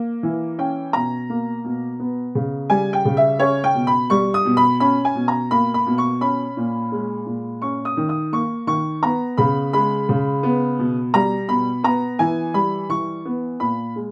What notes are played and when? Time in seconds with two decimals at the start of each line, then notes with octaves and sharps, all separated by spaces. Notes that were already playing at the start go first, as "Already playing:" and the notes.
Already playing: A#3
0.23 E3
0.58 C#4 G5
0.93 B2 A#5
1.30 A#3
1.64 B2
2.00 B3
2.35 C#3
2.70 G3 G#5
2.93 G5
3.05 C#3
3.17 E5
3.39 C#4 C#5
3.64 G5
3.75 B2
3.87 B5
4.10 G3 C#6
4.34 D#6
4.45 B2
4.57 B5
4.80 C#4 B5
5.05 G#5
5.15 B2
5.28 A#5
5.51 A#3 B5
5.74 B5
5.86 B2
5.98 C#6
6.21 C#4 B5
6.57 A#2
6.92 G#3
7.26 A#2
7.62 C#4 C#6
7.85 D#6
7.97 D#3
8.09 D#6
8.33 A#3 C#6
8.67 D#3 C#6
9.02 B3 A#5
9.37 C#3 B5
9.73 G#3 B5
10.09 C#3
10.43 B3
10.79 B2
11.14 G3 A#5
11.49 B2 B5
11.84 B3 A#5
12.19 E3 G#5
12.54 G3 B5
12.89 E3 C#6
13.25 B3
13.60 A#2 B5
13.96 G#3